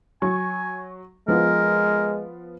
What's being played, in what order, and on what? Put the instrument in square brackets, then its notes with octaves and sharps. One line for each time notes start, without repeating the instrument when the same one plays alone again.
[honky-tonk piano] F#3 C#6 [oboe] G#5
[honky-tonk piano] F3 B3 F4 [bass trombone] G#3 [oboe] A#4